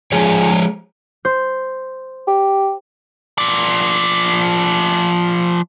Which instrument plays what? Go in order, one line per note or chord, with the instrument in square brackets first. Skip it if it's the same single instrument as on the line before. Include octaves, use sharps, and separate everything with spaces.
[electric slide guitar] F3 G#3 G#4 C#5
[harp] C5
[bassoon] G4
[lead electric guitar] F3 D5